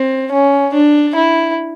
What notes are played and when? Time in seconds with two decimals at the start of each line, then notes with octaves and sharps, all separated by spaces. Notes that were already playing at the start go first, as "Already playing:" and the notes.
Already playing: C4
0.32 C#4
0.74 D4
1.16 E4